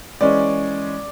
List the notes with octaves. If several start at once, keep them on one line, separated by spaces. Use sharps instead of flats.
E3 G#3 C#4 D5